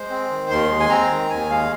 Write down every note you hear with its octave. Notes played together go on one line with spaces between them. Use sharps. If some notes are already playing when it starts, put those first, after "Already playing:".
Already playing: G#3 C5
C4
D#3
D#2 C6
G#3
G#5
C4 A#5
D#3
D#2 G#5
G#3 F5